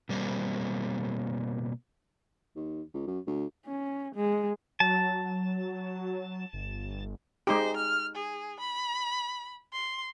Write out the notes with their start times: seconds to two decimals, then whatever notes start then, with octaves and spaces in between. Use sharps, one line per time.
0.09 B2 G3 A#3 C4
2.56 D#2
2.94 C#2
3.07 F#2
3.27 D2
3.66 C#4
4.15 G#3
4.80 F#3 A5
6.53 G1
7.47 G#3 D#4 G4 C5
7.76 F6
8.15 G#4
8.60 B5
9.73 C6